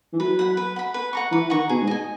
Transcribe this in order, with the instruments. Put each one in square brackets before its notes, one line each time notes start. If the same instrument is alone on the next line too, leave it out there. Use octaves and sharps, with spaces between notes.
[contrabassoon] E3
[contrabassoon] F#3 [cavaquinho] B4
[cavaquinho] F#5 B5
B4
F#5 B5
B4
F#5 A#5 C#6
[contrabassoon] E3 [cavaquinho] B4
[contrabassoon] D#3 [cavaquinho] F#5 A#5 C#6
[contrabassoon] B2 [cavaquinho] G#4
[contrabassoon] G#2
[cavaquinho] D#5 G#5